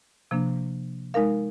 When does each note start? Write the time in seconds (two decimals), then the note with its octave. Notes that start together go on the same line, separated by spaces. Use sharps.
0.31 C3 F3 A#3 D4
1.14 G#3 D#4 A#4 F5